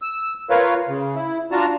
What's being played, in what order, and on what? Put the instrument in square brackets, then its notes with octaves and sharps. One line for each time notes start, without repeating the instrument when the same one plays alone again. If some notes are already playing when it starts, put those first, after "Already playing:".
[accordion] E6
F4 A#4 B4 C#5 F5
C#3
E4
D4 F4 F#4 A5 A#5